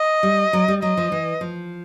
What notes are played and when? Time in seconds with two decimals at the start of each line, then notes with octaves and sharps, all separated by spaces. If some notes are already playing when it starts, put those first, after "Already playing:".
Already playing: D#5
0.23 G3
0.53 F#3
0.68 G3
0.82 F#3 D#5
0.97 F3
1.12 E3
1.41 F3